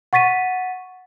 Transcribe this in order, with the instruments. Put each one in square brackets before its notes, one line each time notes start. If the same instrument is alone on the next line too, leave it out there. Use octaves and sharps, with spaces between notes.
[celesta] F#5 C#6 A6 B6 D#7